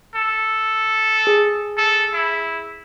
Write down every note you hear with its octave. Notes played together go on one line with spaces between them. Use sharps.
A4
G#4
A4
E4